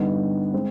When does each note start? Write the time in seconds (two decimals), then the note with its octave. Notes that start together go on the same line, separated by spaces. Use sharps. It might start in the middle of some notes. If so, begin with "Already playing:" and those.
Already playing: G2 D3 G3 B3 D#4
0.53 G#3 C4